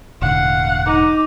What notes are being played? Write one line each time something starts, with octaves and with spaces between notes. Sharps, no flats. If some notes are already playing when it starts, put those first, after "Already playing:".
E1 A2 D3 F5 F#5
D#4 D6